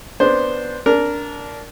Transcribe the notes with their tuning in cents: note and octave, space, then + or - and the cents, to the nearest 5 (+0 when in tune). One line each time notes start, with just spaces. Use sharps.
B3 +0 D4 +0 C5 +0
D4 -20 A#4 +0